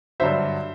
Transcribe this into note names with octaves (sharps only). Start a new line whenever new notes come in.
G2 D3 F#3 C5 E5